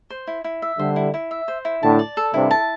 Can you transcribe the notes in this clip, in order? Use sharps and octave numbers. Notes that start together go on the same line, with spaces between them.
C5
E4
E4
E5
D3 G3 C5
E4
E4
E5
C5
E4
A2 D3 A5
D5
A4
G2 C3 E4
A5